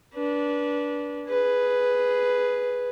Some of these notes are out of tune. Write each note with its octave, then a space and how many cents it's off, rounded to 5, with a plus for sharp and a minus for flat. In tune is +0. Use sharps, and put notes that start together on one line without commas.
D4 -20 B4 -25
G#4 +0 B4 +0